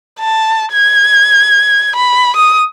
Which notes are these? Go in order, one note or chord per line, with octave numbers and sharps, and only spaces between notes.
A5
G#6
B5
D#6